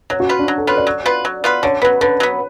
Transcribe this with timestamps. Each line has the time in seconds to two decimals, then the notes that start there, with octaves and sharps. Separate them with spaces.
0.10 F#3 C#5
0.20 F#4
0.29 B3 F4 B4
0.39 D4
0.48 F#3
0.58 A4
0.67 B3 F4 B4 C#5
0.77 D5
0.87 F#3
1.06 B3 F4 B4
1.25 F#3
1.44 B3 F4 B4
1.63 D3 C#5
1.82 F#3 B3 B4
2.01 D3 B4
2.20 F#3 B3